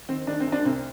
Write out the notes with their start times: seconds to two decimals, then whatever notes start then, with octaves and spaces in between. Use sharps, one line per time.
0.09 D#3 C4
0.27 D#3 D4
0.40 C4
0.46 F#2
0.52 D4
0.65 C2 C4